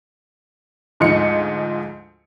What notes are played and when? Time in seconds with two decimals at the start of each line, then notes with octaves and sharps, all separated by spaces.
1.00 D2 G#2 F3 D#5 C#7